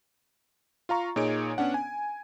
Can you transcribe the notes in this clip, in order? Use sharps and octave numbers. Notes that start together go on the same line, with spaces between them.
F4 F5 A#5 C#6
A#2 D#4 G#4 C#5 D7
B3 C#4 D4 F#5
G#5